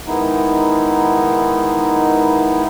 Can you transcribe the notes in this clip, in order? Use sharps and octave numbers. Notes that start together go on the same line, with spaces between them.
D#3 G#3 B3 D#4 E4